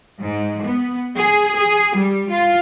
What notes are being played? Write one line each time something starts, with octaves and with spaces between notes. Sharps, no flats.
G#2
B3
G#4
G#4
G3
F4